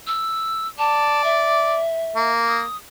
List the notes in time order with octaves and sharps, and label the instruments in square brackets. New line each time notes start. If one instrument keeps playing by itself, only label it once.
[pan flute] E6
[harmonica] D5 [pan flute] A5
[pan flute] E5
[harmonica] A#3
[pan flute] D#6